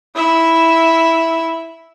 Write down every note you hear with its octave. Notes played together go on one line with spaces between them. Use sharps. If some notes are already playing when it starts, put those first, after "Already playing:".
E4 E5